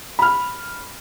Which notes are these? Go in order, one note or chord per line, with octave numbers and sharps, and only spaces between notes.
B5 F6